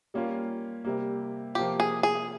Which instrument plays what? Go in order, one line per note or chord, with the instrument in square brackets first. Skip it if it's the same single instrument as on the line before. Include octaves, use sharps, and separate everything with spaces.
[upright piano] G3 A#3 C#4 F4
C3 G3 A#3
[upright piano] C3 F3 A#3 F4 [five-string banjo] G4
[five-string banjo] G#4
G#4